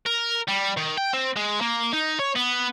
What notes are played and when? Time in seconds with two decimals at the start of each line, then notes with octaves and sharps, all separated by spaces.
0.06 A#4
0.48 G3
0.77 D#3
0.98 G5
1.13 C4
1.36 G#3
1.61 A#3
1.93 D#4
2.19 C#5
2.35 B3